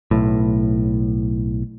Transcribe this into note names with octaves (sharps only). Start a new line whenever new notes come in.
B1 A2